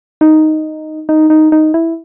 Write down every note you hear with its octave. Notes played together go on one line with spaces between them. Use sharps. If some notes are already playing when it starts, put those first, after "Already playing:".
D#4
D#4
D#4
D#4
E4